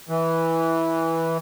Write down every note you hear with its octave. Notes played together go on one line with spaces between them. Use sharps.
E3